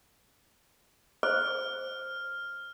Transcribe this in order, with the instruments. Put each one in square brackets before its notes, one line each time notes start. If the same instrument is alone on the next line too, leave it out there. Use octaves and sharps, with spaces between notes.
[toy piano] C5 [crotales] F6